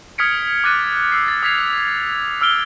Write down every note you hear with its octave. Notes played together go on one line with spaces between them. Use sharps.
D#6 F6 G#6 B6 C#7 D7
D6 F#6 A6 D#7
E6 C7
A6
D#6 G#6 B6 C7 F7
E6 F6 D7 G7